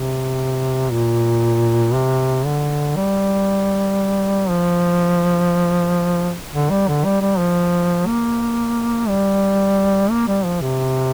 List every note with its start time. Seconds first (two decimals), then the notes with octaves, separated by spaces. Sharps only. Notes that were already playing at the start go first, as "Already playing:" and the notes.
Already playing: C3
0.92 A#2
1.94 C3
2.45 D3
2.96 G3
4.49 F3
6.53 D3
6.70 G3
6.88 D3
7.05 G3
7.21 G3
7.38 F3
8.06 A#3
9.08 G3
10.10 A#3
10.28 G3
10.45 F3
10.61 C3